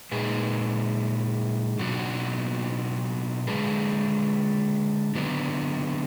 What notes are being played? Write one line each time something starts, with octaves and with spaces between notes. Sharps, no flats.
A#2 G#3 D#4 G#4 B4
B2 F#3 D4 F#4
D3 G#3 D4 G#4 B4
D3 F#3 B3 D4